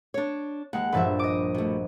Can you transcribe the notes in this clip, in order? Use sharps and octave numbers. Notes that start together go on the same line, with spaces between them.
D4 C#5
D#2 G#3 F#5
A#1 G2 F3 B4 D5 E5
D#5 D6
B2 A3